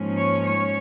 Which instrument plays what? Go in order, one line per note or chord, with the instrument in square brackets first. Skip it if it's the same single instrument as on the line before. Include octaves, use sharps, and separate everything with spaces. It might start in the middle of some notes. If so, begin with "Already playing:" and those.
Already playing: [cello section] G#2 F3 A#3 C#4
C#5
C#5